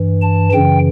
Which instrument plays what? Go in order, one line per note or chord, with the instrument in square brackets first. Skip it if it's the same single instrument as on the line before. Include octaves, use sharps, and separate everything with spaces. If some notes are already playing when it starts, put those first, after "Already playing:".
Already playing: [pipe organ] G2 E3
A5
F#2 C#3 E3 G5